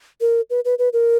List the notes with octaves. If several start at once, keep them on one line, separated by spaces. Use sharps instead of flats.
A#4
B4
B4
B4
A#4